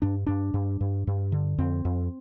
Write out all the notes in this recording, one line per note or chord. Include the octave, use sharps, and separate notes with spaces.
G2 D4
G2 D4
G2
G2
G2
D3
F2 C4
F2